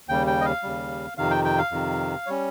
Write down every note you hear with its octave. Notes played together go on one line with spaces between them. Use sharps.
D#2 C#3 G3 G5
G5
D#5
F5
D#2 C#3 G3
F2 C3 D#3 F5
G5
G5
F5
F2 C3 D#3
G3 C#4 C#5